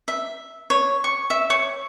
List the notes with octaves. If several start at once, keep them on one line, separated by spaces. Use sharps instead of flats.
E5
C#5
C#6
E5
C#5